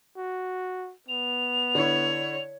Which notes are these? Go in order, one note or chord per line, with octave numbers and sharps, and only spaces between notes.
F#4
B3 F7
D3 E4 C#5